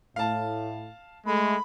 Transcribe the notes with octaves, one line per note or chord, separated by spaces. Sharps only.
A2 F5 A5
G#3 A3 B5